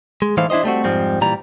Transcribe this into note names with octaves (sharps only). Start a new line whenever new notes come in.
G#3
A2 E3 D#4 C5 F5
D4 E4 G4 C5 D#5
G3 A3 C4 F#4
F2 G#2 F3 G3 C4
A#2 E3 G3 A#5